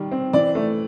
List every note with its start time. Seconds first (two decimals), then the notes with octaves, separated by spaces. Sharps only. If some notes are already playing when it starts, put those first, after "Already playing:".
Already playing: D#3 G3
0.11 C4
0.33 E3 D5
0.55 A3